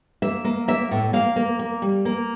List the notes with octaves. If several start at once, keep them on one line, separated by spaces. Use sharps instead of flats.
A#3 E5
A#3
A#3 E5
A2
A#3 F5
A#3
A#3
G3
A#3